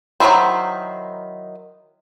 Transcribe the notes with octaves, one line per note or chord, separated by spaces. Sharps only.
D#3 F#3 G#3 E4 C5